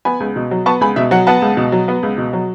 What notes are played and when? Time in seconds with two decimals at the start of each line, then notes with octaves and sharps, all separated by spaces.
0.05 B3 G#5 B5
0.20 C#2
0.36 B2
0.51 F#3
0.66 B3 A5 C#6
0.81 C#2 G#5 B5
0.96 B2 E5
1.11 F#3 F#5
1.27 B3 F#5 A5
1.42 C#2
1.57 B2
1.72 F#3
1.88 B3
2.03 C#2
2.18 B2
2.33 F#3